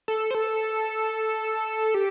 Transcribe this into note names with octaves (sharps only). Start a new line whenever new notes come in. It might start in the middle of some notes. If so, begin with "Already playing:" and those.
A4
C5
A4
G4